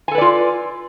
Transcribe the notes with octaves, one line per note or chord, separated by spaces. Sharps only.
F4 A4 B4 D5 G#5